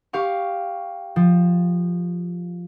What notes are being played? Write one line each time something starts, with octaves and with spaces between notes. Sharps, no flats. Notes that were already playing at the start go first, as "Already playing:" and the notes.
G4 F5 C#6
F3